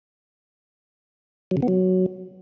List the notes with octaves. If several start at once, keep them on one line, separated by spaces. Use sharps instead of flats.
F#3
C#3
B3
F#3